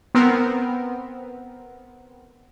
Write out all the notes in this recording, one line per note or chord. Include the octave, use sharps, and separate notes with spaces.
B3 C4 A#4